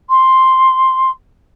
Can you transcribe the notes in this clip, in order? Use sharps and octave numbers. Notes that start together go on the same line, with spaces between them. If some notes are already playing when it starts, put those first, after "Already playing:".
C6